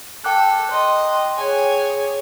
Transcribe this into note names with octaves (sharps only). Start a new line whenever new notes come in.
A4 G5 D6 F#6
D#5 C6
G#4 C#5 G#5